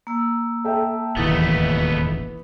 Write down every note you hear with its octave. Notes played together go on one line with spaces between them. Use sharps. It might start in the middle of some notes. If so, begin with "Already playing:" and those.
A#3 E6
A4 E5 G5
E1 A1 D#2 E3 A3 B3 D#6 A6